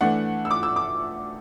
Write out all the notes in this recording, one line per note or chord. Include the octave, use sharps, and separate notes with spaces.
E3 A3 D4 F#5
E6
D6
E6
D6